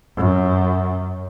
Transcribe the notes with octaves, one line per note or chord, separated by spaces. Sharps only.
F#2